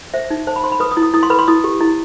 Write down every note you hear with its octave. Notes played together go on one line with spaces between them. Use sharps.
C5 E5
D#4
C5 A5
B5
C5 C6
B5
B4 D#6
D#6
E4
D#6
E4 D#6
C6
B4 B5
C6
E4 D#6
G4
E4